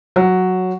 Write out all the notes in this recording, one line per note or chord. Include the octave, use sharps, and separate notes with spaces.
F#3